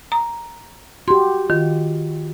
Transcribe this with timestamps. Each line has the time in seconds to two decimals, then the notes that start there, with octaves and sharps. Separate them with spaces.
0.12 A#5
1.08 F#4 G4 C6
1.50 D#3 F4